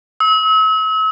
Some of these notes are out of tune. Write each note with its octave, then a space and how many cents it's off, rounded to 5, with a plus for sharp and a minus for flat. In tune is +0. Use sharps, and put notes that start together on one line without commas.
E6 -40